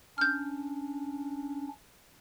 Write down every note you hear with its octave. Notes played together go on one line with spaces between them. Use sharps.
C#4 D4 F6 G6